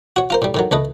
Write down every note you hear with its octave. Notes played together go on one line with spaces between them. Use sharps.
F#4 C#5
F4 A#4 C5
A2 G3
A2 D#3 F#3
C#2 A3 B4 D#5